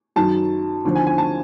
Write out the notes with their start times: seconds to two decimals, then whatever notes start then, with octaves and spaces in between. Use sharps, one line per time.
0.16 F#2 D#3 F#3 A5
0.84 D#2 D3 F3
0.95 G#5
1.07 G#5
1.18 A5